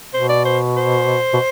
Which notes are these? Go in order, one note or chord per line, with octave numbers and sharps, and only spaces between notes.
B2 C5
D5
C5
C5
B2